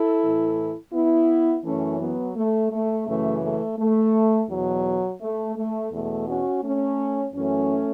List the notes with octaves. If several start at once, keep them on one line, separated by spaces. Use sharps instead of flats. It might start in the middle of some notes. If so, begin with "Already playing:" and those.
Already playing: E4 A4
A2 E3
B3 E4
F#2 E3 A3 C#4
F#3 B3
A3
A3
F#2 C#3 E3 A3
A3
A3
E2 B2 F#3
A3
A3
E2 B2 A3
C#4 F#4
A3 C#4
F#2 E3 A3 C#4